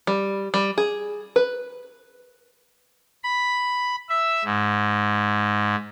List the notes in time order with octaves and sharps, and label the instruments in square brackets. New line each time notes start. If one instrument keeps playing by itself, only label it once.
[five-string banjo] G3
G3
G#4
B4
[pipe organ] B5
E5
G#2